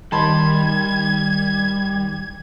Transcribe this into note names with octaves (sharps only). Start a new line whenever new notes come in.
D#3 G3 A5 B5 C6 G#6